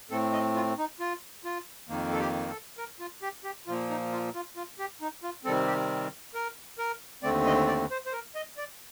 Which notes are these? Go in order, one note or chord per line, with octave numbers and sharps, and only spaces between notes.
A2 A3 C4 A4
D#5
F4
D#4
F4
F4
F2 D#3 A#3
A4
G4
A4
A#4
F4
G4
G4
A#2 F3 A#3 F4
D#4
F4
F4
F4
G4
D#4
F4
C3 D#3 G3 C4 A4
G4
A#4
A#4
D#2 D3 A3 C4 D5
D#5
D5
C5
C5
A#4
D#5
D5